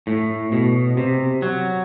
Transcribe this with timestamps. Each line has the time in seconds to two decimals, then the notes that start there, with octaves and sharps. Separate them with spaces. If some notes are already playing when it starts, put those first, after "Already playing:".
0.07 A2
0.52 B2
0.97 C3
1.42 F#3